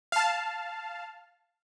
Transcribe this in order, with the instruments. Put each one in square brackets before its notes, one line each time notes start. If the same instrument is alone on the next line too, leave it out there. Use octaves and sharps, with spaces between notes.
[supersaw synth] F5 A5